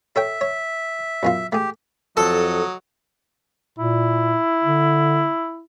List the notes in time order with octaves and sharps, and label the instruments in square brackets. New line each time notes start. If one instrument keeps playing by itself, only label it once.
[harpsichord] A4 C#5 G5 [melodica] E5
[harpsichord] C#5
F#2 B2 F4
[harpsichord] A3 G#4 [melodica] G4
[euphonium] F2 [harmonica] F#3 D#5 [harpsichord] A4
[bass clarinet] A#2 [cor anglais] E4
[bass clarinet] D3